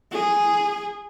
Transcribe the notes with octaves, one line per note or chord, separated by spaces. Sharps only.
G#4